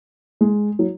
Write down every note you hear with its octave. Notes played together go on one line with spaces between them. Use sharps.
G#3
F#3